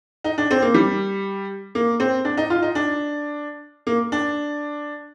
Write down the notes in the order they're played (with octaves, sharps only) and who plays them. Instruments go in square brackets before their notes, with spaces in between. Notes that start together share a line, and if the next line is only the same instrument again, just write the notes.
[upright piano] D#4
D4
C4
A#3
G3
A#3
C4
D4
D#4
F4
D#4
D4
A#3
D4